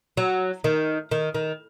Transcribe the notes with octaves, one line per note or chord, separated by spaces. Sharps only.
F#3
D#3
D#3
D#3